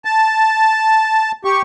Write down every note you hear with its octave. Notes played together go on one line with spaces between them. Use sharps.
A5
G4 C#6